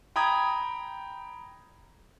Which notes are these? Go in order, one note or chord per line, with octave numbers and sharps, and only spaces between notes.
G5 A#5 B5 D#6 G#6